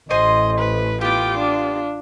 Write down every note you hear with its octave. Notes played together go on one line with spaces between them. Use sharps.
A1 C5 D#5 G#5 C6
B4
B3 F4 G4 G5 D6
D4